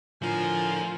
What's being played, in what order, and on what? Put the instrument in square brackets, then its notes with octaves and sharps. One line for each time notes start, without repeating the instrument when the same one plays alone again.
[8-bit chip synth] A2 D3 A#4 [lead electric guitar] F3 [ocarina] F4 [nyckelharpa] G#5